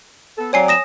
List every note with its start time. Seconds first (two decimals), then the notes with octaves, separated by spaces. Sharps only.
0.38 B3 A4
0.53 F#3 C4 C#5 D5 G#5 C7
0.68 D#6 A#6 E7